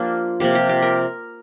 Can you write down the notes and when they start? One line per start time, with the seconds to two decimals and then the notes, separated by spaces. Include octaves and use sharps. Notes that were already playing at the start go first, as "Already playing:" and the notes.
Already playing: F3 A#3 D4 F4 G4
0.40 C3 F3 A#3 G4
0.55 G4
0.69 G4
0.82 A#4